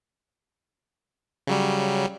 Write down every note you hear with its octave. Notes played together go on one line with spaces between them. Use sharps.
C#3 F#3 G3